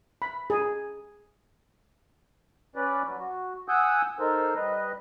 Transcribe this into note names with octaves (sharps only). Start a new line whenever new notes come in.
B5
G#4
C#4 B4 D5
F#3
F#4
F#5 G#5 D#6 E6 G6
D#4 A4 A#4 C5
G3 B4 D#5